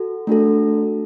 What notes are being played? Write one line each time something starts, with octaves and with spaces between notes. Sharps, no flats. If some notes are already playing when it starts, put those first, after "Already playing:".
Already playing: F#4 A4
A3 D4 F#4 A4